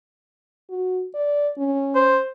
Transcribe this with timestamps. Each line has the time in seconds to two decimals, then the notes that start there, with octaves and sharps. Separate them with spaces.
0.70 F#4
1.15 D5
1.58 C#4
1.95 C5